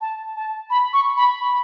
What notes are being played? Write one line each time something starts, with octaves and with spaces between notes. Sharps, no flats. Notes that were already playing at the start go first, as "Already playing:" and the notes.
A5
A5
B5
C#6
B5
B5